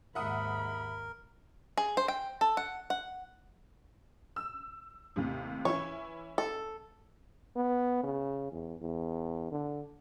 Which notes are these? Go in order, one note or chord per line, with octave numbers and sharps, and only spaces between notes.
D#2 G#2 A#4 E5 F#5 B5 D#6
G#4
C5
G5
A4
F#5
F#5
E6
D#2 A2 C3
E3 C#4 E4 C#5
A4
B3
C#3
E2
E2
D3